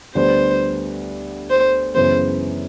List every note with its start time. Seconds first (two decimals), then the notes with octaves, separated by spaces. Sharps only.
0.15 D2 D3 G3 B3 D4 C5
1.50 C5
1.95 F#2 C#3 E3 G#3 B3 C5